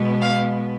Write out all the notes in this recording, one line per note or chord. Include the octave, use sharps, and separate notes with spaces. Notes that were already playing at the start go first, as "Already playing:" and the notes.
Already playing: B2 G#3 B3
F5